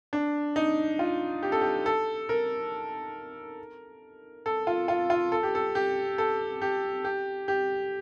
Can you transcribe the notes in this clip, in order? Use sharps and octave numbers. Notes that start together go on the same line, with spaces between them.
D4
D#4
F4
G4
A4
G4
A4
A#4
A4
F4
F4
F4
A4
G4
A4
G4
A4
G4
G4
G4